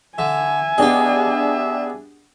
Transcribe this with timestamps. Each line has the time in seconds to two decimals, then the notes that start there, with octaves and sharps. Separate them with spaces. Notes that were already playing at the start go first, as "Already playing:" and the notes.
0.19 D3 E5 G#5
0.78 B3 D4 G4 G#4 D#5